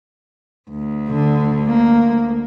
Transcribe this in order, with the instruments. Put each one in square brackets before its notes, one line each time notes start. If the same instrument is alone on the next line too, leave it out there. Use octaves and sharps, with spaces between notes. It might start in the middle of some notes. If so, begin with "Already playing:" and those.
[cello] D2
[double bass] D3
A#3